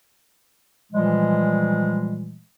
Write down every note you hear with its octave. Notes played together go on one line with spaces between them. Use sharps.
A#2 E3 F3 G3 G#3